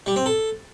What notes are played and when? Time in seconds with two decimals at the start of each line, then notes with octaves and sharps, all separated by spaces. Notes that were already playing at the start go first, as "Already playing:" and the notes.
0.06 G3
0.16 C4
0.26 A4